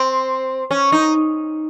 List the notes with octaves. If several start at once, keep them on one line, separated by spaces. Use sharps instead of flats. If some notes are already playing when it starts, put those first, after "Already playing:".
Already playing: C4
C#4
D#4